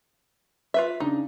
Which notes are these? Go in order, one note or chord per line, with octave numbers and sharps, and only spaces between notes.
F4 B4 E5
C#3 D4 D#4